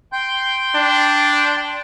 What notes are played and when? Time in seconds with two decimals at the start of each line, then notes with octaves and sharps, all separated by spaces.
0.13 G5 C6 G6
0.75 D4